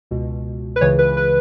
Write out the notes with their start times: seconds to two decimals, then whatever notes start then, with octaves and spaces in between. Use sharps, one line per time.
0.11 C#2 B2
0.76 B4
0.81 C#2 C#3 E3 C#5
0.99 B4
1.17 B4